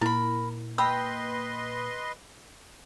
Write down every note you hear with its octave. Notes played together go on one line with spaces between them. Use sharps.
A#2 A#3 E4 A#4 B5
B4 D#5 G5 B5 C6 E6